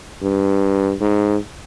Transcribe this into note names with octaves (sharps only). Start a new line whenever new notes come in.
G2
G#2